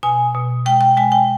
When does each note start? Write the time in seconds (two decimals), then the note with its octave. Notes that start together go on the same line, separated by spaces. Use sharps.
0.03 B2 G#5
0.35 B2
0.66 G#3 G5
0.81 G5
0.97 G#3 G#5
1.12 G5